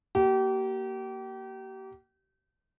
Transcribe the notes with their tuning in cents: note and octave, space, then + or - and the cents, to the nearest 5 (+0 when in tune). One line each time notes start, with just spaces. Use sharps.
A#3 +0 G4 -35